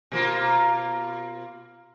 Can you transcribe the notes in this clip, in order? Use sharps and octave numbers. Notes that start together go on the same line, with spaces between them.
B2 A#3 F4